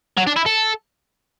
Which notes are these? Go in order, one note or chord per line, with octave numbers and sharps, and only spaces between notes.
F#3
D4
E4
A4